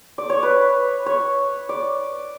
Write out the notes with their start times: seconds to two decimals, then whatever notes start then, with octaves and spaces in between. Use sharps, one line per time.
0.18 D5
0.30 C#5
0.43 B4
1.06 C#5
1.69 D5